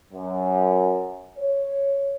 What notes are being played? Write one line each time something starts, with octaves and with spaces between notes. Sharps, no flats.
F#2
C#5